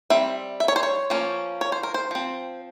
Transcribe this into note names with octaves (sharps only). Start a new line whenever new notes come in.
G3 C4 E5
E5
C#5
C5
C#5
F3 A#3 C#4
C#5
C5
A#4
C5
F3 C4